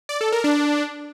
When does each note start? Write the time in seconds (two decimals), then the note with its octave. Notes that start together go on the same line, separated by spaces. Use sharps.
0.09 D5
0.21 A4
0.32 A#4
0.44 D4